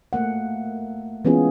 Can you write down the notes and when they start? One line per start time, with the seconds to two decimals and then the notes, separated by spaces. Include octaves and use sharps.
0.13 A3 A#3 F#5
1.25 E3 G#3 B3 C#4 F4 G#4